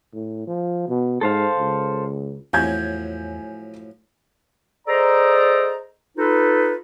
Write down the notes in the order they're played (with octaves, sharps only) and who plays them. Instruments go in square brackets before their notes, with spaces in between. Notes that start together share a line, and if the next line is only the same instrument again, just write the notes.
[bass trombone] A2
F3
B2
[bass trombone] G#2 [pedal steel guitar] A4 C5 F5
[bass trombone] C#2
[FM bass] E2 [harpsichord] A2 F3 F#3 [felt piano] G#5 G6 G#6
[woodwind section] G#4 A4 C5 D5 D#5 A#5
D#4 F4 A4 B4